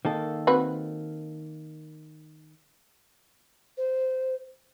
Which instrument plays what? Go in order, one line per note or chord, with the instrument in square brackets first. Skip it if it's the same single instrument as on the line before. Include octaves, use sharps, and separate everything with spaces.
[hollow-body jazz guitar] D#3 A#3 A4
[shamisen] C4 F#4 B4
[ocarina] C5